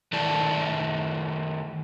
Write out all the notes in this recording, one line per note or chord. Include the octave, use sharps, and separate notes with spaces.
D#3 A3 E4 D5 A5